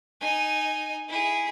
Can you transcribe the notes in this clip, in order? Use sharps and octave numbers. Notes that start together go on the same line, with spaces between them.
D#4 G#5
E4 G#4